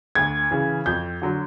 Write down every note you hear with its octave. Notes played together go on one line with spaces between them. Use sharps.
D2 G#6
C#3 E3
F2 G6
D3 F#3